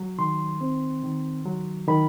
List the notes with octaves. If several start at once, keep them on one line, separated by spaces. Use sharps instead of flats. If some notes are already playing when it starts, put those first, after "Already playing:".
Already playing: F#3
D#3 C6
C4
D#3
F#3
D#3 B5